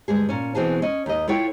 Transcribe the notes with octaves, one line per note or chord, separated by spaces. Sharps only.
D2 G2 G#3 G#4
A#2 C#4
B2 E3 C4 F#4 G#4 A5
C#4 D#5
D#2 D#5
E4 F4 A4 C#5 G5